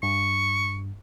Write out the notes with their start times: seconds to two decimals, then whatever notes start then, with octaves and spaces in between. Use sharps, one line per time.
0.03 G2 C#6